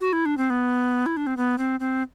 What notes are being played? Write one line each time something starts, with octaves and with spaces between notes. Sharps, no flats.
F#4
E4
D4
C4
B3
E4
D4
C4
B3
C4
C4